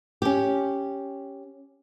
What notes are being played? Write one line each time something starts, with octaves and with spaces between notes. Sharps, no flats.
C#4 G4